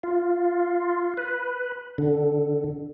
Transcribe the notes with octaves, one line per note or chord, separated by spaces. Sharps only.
F4
B4
D3